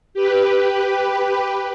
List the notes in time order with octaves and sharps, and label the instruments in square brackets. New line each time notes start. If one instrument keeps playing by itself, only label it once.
[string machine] G4 B4